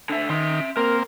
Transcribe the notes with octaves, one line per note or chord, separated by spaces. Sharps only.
D3 E5
D#3 E5 C6
A#3 C4 A#4